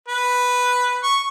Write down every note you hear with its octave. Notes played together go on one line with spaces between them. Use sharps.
B4
C#6